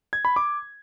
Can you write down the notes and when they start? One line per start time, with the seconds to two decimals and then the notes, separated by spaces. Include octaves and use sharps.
0.13 G#6
0.25 B5
0.36 D6